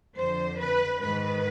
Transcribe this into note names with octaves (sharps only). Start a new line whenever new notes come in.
F2 D3 C5
B4
G#2 D#3 B4